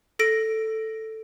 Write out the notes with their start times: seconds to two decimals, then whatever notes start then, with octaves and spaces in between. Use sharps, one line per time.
0.19 A4 A#6 D7